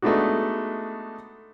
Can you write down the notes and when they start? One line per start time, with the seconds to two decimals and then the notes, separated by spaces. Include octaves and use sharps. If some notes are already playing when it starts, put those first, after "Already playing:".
0.02 G#3 A3 B3 D4 D#4 F#4